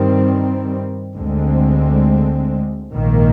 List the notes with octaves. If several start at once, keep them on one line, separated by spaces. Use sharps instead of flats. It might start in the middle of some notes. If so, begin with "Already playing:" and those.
Already playing: G2 D#3 G3 C4
D2 D3 G#3 C4
A#1 G#2 D#3 A#3